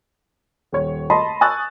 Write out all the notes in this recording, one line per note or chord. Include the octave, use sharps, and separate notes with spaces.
D#1 C#5
D#5 A5 B5 C6
G#5 C#6 D#6 E6 F#6 A6